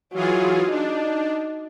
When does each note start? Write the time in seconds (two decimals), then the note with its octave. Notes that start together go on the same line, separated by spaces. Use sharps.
0.14 E3 F#3 F4 G#4
0.70 D4 D#4